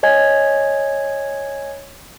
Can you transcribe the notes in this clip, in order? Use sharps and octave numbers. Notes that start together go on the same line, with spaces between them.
C#5 D#5 G#5 G#6